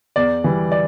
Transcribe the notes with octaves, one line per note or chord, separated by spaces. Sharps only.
E2 D5
E3 G3
D5